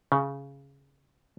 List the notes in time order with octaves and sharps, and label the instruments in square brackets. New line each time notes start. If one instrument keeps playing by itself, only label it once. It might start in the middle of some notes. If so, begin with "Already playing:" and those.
[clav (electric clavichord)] C#3